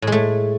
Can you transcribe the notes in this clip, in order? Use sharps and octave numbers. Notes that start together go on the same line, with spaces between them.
A2 G#3 A3